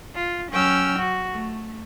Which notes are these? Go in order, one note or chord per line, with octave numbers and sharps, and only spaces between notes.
F4
F#3 C#4 G5 E6 F6
F#4
A3